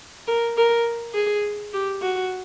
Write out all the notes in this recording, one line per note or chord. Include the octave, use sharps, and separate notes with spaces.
A#4
A#4
G#4
G4
F#4